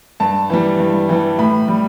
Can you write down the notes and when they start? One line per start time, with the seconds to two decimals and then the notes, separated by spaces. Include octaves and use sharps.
0.20 G2 A5
0.50 E3 G3
0.80 G2
1.09 E3 G3
1.39 A2 B5
1.68 G3